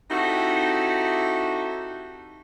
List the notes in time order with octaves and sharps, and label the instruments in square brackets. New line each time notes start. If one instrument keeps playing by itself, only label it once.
[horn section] C4 D#4 E4 F#4 G4 A4